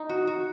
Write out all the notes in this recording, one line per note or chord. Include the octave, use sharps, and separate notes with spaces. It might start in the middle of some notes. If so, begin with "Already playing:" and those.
Already playing: D#4
F#4
F#4